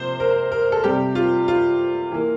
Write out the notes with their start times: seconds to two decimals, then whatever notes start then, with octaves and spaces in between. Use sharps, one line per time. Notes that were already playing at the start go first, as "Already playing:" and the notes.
Already playing: C3 F3 A#3 C5
0.20 A#4
0.52 A#4
0.72 A4
0.83 C3 G3 C4 G4
1.15 F4
1.48 F4
2.12 E3 A#3